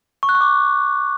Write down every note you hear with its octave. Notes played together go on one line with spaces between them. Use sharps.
C#6
F#6
C#6
D6